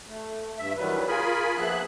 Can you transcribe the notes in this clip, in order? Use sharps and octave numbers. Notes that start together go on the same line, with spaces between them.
A3
G2 E5
D#3 E3 F#3 G3 B4
F4 G#4 A#4 G#5 B5
F3 A#3 B3 G#4 E5 F#6